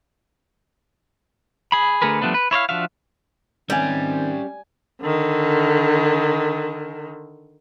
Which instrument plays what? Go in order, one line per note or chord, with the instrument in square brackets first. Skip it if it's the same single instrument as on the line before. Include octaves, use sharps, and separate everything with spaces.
[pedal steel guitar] G#4 B5
D3 A3 G#4 A#4 B4
F3 G3 A3 B3 D4
B4
E4 C#5 D5 F5
F3 D4 F#4 E5 F5
[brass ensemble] D#3 C4 [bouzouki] G3 [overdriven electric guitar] C#4 E5 [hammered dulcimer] G#5 D6
[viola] D3 D#3